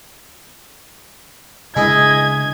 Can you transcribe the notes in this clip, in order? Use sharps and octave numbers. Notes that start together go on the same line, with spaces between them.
C#3 G#3 D4 E4 G#4 D#5 G#6